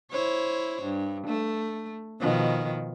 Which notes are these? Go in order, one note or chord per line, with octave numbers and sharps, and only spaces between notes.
E4 C5 C#5
G2
A3
B2 D#3 F3